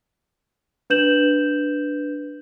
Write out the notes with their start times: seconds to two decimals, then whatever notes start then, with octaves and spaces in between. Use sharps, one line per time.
0.90 D4 B4 G6 E7 F#7